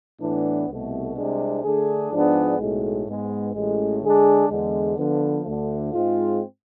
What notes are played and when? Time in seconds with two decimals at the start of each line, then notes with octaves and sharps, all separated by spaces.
0.20 A2 E3 B3 D4
0.68 C2 B2 A3
1.16 C2 C3 G#3 D4
1.63 D3 A3 D4 G#4
2.11 G#2 F3 B3 D4 G#4
2.59 B1 A2 G#3
3.07 G#2 G#3 B3
3.54 A1 A2 G#3
4.02 D3 G#3 D4 G#4
4.49 E2 D3 G#3
4.97 D3 F3 B3
5.45 D2 D3 A3
5.93 G#2 G#3 C4 F4